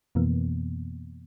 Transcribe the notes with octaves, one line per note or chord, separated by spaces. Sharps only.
F2 B2 E3 A#3 B3